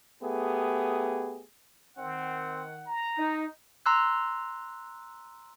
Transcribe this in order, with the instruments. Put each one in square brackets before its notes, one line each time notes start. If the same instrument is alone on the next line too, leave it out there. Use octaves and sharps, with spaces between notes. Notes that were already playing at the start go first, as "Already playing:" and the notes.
[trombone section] A3 B3 G4 G#4
[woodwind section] D#3 F#5 [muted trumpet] C4
[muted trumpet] A#5
[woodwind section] D#4
[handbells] A#5 C6 E6 F#6